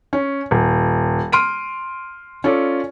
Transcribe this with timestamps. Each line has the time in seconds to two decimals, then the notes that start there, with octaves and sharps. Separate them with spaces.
0.13 C#4
0.51 D#1
1.32 C6 F6 D7 D#7
2.44 C#4 F4 A4 D5